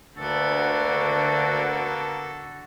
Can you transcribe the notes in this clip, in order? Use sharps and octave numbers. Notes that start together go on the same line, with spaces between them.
D2 D3 A#3 B3 F#4 A4 A5